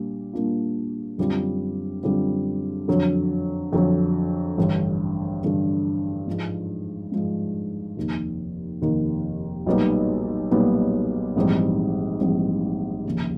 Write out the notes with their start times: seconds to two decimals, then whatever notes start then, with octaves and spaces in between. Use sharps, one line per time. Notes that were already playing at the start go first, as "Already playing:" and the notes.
Already playing: A#2 G3 A#3 D4
0.33 A#2 G3 A#3 D4 F4
1.18 F#2 D3 G3 C4 F4
2.03 F#2 D3 G3 C4 F4
2.88 F2 D3 F#3
3.72 F2 D3 F#3
4.58 A1 G2 D3
5.43 A1 G2 D3
6.27 G#2 F3 G#3
7.12 G#2 F3 G#3
7.97 F1 D#2 D#3
8.82 F1 D#2 D#3
9.66 B1 A#2 G3 B3 D#4
10.51 B1 A#2 G3 B3 D#4
11.36 A#1 G#2 E3 G3 C4
12.21 A#1 G#2 E3 G3 C4
13.05 F1 D#2 C#3